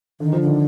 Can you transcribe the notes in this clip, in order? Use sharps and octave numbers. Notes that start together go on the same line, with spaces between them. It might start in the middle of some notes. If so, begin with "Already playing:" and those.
D3 D#3
F3
D3
D#3